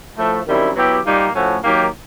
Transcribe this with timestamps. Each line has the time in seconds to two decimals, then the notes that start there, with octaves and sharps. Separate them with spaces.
0.17 A2 F3 A3
0.47 F#2 D#3 G3 C4 E4
0.76 F#3 B3 E4 G4
1.05 A#2 G3 A#3 D#4 G4
1.34 A2 F3 A3 C#4 F#4
1.64 D#3 F#3 A#3 D#4 G4